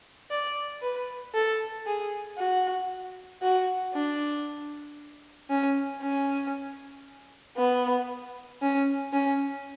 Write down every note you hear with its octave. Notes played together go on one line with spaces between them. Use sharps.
D5
B4
A4
G#4
F#4
F#4
D4
C#4
C#4
B3
C#4
C#4